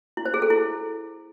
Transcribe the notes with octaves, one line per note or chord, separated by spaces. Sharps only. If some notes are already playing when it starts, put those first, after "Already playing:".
E4
C5
G#4
A4
E4